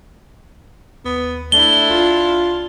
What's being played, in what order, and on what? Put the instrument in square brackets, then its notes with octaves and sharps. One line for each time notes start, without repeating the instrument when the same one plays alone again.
[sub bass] D#2 [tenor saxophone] B3
[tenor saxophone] A3 [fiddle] D4 E4 [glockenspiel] G7
[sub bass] C2 [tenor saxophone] F4